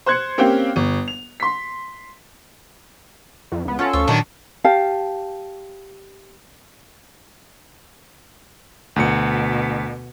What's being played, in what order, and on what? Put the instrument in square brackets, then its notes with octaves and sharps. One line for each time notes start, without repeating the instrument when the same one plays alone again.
[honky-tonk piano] C5 C6 F#6 G#6 C#7
A#3 C4 C#4 G4 F5 G5
G1
F7
C6 B6
[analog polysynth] F2
C#2 B3
[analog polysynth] C#4 F4 A4 [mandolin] F#5
[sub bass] D2 [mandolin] C5 C#6 E6
[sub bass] A#2 [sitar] D#3 F#3 [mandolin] D4 C#6
[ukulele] G4 F5 A5
[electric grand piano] D2 C#7 [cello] B2